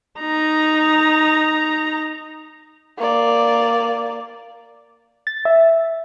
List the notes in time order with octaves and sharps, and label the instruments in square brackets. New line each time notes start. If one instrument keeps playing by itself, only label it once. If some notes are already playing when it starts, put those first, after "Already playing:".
[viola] D#4 A#5
[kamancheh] A#3 D5
[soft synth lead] A6
E5